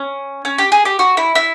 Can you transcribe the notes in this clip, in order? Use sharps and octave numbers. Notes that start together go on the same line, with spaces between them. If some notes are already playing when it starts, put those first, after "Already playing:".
Already playing: C#4
C#4
G4
G#4
G4
F#4
E4
E4